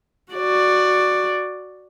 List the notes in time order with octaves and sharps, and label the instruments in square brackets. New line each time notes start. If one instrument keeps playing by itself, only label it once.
[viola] F#4 D5